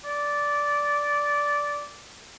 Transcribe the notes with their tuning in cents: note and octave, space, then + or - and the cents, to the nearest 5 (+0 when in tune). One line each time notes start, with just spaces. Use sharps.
D5 -10